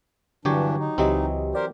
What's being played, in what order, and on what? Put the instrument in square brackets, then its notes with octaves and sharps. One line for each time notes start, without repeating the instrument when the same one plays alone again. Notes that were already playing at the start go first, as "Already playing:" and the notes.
[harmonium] G2 E3 D4 [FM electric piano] D3 [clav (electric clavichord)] F#3 G4 C#5
[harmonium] D#4
[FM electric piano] C#2 G4 D#5 [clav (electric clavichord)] E3 F#3 C4
[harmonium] G4 A#4 C5 [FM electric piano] D5